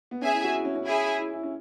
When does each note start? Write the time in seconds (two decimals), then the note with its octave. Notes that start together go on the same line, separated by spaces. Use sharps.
0.11 B3
0.22 C#4 G#4 E5 G#5
0.33 E4
0.44 F#4
0.55 E4
0.65 C#4
0.75 C#4
0.86 E4 G#4 E5 G#5
1.19 E4
1.33 E4
1.43 C#4